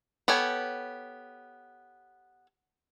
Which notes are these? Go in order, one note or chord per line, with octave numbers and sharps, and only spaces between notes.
B3 G4 A4 C#5 G#5